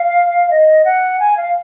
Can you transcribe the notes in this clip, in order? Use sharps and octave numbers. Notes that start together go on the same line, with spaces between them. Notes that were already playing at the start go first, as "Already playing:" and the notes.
Already playing: F5
D#5
F#5
G#5
F5